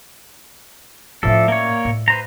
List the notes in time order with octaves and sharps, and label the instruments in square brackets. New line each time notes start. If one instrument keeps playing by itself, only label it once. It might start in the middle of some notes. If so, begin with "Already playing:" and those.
[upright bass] A2 C#4 [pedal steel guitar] F3 A4 [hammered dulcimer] D5 E5 F#5
[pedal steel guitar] A#3 C#5
[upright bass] A2
[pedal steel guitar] B4 C5 A#5